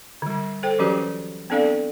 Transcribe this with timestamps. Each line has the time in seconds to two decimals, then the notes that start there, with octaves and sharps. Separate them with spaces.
0.22 D3 G3
0.63 A4 C5 G5
0.79 E3 F#3 C#4 F#4 G4 B4
1.50 B3 C4 D4 A4 D5 F5